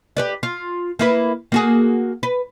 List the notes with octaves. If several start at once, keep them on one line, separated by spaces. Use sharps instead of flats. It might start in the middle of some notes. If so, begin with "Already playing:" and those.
G4 B4 D5
F4
A#3 E4 B4
A#3 F#4 G#4
B4